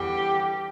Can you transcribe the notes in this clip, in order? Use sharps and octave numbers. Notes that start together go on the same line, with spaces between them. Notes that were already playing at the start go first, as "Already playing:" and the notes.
Already playing: E2 D3 G3 G4